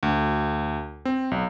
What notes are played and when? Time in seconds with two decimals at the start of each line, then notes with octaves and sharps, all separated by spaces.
0.03 D2
1.05 C4
1.31 B1